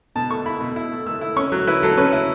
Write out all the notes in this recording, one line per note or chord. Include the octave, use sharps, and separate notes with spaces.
B2 A5
A3 C#6
E4 B5
B2
E4
A3
A3 E6
E4
C#4 C#6
F#3
E4 B4
F#3 A4
C#4 B4
E4